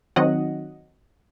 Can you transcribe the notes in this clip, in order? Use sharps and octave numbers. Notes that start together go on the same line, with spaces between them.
D#3 F#3 C4 D#4 D#5 F#5